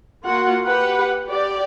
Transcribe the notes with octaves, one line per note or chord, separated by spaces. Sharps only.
A#3 F4 F#4 F#5
G4 B4 F#5
G4 D5